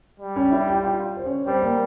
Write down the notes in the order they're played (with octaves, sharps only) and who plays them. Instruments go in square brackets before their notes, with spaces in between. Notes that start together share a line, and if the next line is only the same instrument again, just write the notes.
[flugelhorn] G3
[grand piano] C#4 C#5
E4 E5
G4 G5
F4 F5
C5
C#4 C#5
[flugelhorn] G3 [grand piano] C4 C5
[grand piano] A#3 A#4